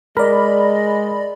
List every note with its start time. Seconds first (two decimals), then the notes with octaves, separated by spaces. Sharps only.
0.17 G#3 A#4 D5 D#5 B5